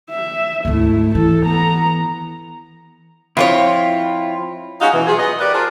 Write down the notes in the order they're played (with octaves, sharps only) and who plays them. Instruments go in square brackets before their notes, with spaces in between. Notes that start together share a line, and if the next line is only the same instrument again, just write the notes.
[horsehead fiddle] E5
[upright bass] G#1 D2 [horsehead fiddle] A3 E4
[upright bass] E3 [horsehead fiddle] A4
[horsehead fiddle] B3 A#5
[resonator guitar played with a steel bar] F2 C4 C#5 [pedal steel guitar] E4 F4
[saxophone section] G#3 C#4 D#4 F4 F#4 F5
B2 E3
F#3 F4 G4 G#4
B3 D#5
F#4 G4 A#4 B4 D5
D4 F4 G#4 A#4 C5 D5